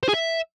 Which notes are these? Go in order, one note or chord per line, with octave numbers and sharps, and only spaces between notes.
C5
G#4
E5